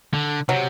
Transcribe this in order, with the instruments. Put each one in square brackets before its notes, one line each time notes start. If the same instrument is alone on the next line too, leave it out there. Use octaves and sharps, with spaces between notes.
[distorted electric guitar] D3
[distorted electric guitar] C3 [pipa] F#3